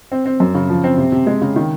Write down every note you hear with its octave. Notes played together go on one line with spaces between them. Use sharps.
C4
C4
F#2
C#3
F3
C4
C3
C3
G#3
C#3
D#3